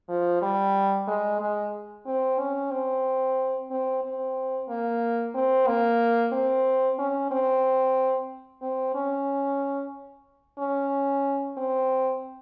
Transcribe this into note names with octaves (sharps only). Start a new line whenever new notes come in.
F3
G3
G#3
G#3
C4
C#4
C4
C4
C4
A#3
C4
A#3
C4
C#4
C4
C4
C#4
C#4
C4